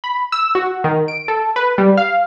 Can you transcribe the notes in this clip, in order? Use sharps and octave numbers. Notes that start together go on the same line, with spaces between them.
B5
E6
F#4
D#3
D7
A4
B4
G3
F5